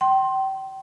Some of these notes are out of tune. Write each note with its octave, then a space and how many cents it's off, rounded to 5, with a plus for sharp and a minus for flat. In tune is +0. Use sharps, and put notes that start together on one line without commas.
G5 -30 C6 +15